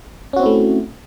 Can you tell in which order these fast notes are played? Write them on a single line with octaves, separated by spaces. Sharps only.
C#4 F#4 C4 E4 A3